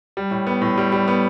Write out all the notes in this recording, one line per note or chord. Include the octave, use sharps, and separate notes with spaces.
G3
A2
B3
A2
G3
G3
B3